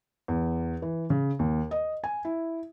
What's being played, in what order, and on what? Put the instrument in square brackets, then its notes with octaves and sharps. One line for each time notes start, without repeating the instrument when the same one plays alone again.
[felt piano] E2
E3
C#3
D#2
D#5
G#5
E4